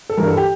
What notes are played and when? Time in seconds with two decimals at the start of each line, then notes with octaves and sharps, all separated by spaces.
0.10 A4
0.17 G2 E3 G3 A#4
0.28 A4
0.37 G4